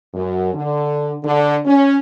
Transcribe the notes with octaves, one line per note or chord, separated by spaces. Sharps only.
F#2
D3
D3
C#4